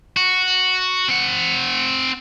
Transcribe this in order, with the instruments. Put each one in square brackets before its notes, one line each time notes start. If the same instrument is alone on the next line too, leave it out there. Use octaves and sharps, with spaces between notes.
[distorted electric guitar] F#4
C4 F#5